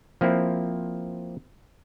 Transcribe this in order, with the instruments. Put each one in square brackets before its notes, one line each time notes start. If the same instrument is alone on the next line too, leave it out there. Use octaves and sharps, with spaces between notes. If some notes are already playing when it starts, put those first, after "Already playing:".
[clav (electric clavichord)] F3 A#3 C4 E4